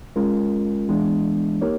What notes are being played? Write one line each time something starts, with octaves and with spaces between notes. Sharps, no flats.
G#3 C#4 F4 A#4
E3 G#3 B3 D4
A#3 D#4 G4 A#4 C#5